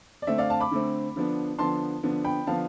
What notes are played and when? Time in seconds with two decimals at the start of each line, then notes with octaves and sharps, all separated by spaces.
0.22 D5
0.27 D3 A3 C4 E5
0.38 D5 F5
0.50 F5 A5
0.60 B5 D6
0.71 D3 A3 C4
1.16 D3 F3 B3 D4
1.59 D3 F3 B3 D4 A5 C6
2.03 D3 F3 B3 D4
2.24 G5 B5
2.47 D3 F3 B3 D4 F5 A5